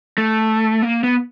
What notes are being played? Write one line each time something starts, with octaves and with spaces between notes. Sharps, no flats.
A3
A#3
B3